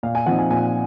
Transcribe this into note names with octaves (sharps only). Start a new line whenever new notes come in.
A#2 F5
G#5
F3 C4 D#4 F#5
G#5
A#2 G#5